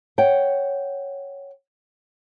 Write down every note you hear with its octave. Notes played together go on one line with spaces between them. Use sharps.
C#5 F#5 G5